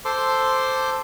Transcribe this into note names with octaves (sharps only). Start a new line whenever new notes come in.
A4 C5 C6 D6